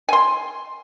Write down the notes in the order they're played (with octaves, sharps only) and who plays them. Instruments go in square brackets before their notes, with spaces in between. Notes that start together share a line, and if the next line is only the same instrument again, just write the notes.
[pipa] G#5 C6